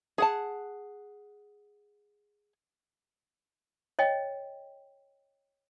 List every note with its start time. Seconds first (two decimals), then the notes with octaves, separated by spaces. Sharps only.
0.18 G#4 F#5 A5
3.99 C#5 D#5 G5